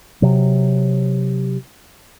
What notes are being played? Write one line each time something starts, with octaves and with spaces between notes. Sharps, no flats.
C3 F#3